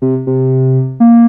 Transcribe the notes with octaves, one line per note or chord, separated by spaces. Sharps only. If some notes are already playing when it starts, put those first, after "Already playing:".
C3
C3
A#3